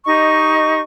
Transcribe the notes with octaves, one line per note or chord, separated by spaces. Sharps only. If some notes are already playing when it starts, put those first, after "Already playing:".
D#4 G4 D#5 C#6